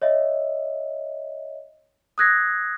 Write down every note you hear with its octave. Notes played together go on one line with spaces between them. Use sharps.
C#5 D#5 E5
D#6 E6 F#6 G#6 A#6 C7